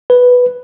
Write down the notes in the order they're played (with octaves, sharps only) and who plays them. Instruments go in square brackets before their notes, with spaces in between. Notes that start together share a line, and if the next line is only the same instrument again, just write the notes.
[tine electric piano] B4